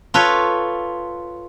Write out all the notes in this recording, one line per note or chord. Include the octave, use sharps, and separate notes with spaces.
F4 A4 B4 C#5